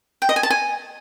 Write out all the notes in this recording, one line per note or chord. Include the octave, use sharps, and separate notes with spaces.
G5
D#5
G#5
A5
G#5